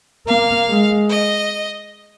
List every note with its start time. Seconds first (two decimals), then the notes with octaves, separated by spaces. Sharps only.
0.28 A#3 F5
0.69 G#3
1.10 D#5